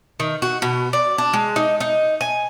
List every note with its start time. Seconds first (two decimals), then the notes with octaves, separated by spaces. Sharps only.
0.20 D#3
0.42 F#4
0.62 B2
0.93 D5
1.18 D4
1.33 G#3
1.56 D#4
1.80 D#4
2.21 G#5